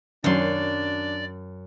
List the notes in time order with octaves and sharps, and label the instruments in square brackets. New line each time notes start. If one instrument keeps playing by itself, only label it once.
[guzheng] F#2 C6 [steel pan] D#3 F#3 [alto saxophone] D4 [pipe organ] D5